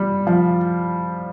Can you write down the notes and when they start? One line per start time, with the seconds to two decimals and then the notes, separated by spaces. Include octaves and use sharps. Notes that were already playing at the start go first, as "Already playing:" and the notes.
Already playing: G3
0.27 F3